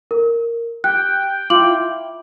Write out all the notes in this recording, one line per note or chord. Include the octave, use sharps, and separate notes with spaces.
A#4
G4 G5 F#6
E4 F4 D6 F#7